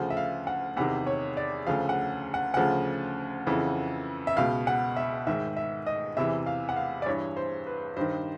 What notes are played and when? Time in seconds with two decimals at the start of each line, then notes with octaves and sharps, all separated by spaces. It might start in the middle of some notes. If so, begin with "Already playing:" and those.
Already playing: D2 C#3 F3 F#5
0.10 E5
0.17 F5
0.47 F#5
0.77 E2 C3 D#3 F#5
1.07 C#5
1.37 D5
1.67 D2 C#3 F3 F5
1.89 F#5
2.34 F#5
2.54 D2 C#3 F3 F#5
3.47 F2 C#3 E3
4.27 E5
4.37 C#2 B2 F5
4.67 F#5
4.96 E5
5.27 G#2 D#3 E5
5.57 E5
5.87 D#5
6.17 E2 C3 E3 E5
6.46 F5
6.69 F#5
6.76 F5
7.02 D5
7.06 G2 E3 C#5
7.36 C5
7.67 B4
7.96 G2 D#3 C5